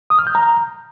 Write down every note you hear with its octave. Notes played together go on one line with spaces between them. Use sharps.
D#6
F6
G6
A#5